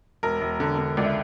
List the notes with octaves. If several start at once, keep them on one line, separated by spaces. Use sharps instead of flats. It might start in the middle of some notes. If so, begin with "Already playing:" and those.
E1 A#4
E1
D3
D3
C#2 D5
E5